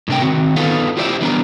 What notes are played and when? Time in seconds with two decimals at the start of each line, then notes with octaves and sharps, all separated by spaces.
0.08 A2 C3 D4 A#4 G5
0.21 D#3 C4 F#4
0.56 B3 D#4 F4 A4 B4 F5
0.97 E4 F4 G4 C5 D5 E5
1.21 E3 G3 B3 D4 D#4 A#4